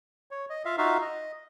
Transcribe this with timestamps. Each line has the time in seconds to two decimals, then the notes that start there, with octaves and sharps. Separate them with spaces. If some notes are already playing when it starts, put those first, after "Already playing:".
0.31 C#5
0.50 D#5
0.65 F4 E5 F5
0.78 D#4 F4 F#4 E5 F5
1.01 D#5